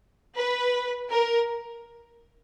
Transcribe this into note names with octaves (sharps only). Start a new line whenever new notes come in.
B4
A#4